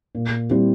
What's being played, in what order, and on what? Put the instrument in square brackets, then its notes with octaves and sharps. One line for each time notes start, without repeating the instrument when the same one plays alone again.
[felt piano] A#2
G3 C4 E4 G4